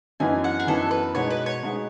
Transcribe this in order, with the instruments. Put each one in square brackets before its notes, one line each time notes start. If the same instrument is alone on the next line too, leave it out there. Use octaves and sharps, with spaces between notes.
[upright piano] F#2 E3 B3 D#4 [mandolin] G#5
[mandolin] F#5
G#4
[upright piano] F#2 E3 B3 D#4 [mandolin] A4
[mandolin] B4
[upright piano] B2 G#3 B3 D#4 [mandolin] C#5
[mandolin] B4
C#5
[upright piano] B2 G#3 B3 D#4